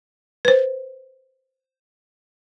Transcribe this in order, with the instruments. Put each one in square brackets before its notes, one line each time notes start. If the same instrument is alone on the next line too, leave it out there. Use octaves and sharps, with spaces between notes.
[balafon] B4 C5